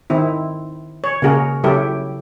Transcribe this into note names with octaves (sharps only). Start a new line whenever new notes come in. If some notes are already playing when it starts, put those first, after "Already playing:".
D#3 C4 E4
C#5
C#3 A#3 F#4 G#4 A#4
C#3 F#3 E4 G4 A4